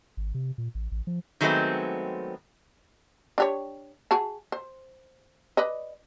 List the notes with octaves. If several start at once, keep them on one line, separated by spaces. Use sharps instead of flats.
G#1
C3
A#2
A1
A1
F3
D#3 F#3 G#3 A3 B3 C4
D4 G4 C#5
F#4 G#4 A5
C5
B4 D5 D#5